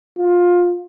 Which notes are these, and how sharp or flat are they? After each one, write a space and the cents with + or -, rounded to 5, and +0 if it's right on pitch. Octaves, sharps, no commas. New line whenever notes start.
F4 +20